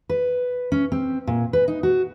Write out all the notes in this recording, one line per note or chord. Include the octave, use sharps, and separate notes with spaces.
B4
C#4
C4
A#2
B4
D#4
F#4